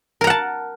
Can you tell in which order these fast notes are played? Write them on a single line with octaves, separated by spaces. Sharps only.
A#4 A#5 F#5 A5